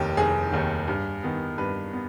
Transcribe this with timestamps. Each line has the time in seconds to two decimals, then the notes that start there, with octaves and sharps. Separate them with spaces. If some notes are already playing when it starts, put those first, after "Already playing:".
Already playing: F1 D#2 D#3 G4
0.17 F1 G#4
0.52 D#2 D#3
0.88 G2
1.23 D#3 B3
1.58 G2 B4
1.93 B3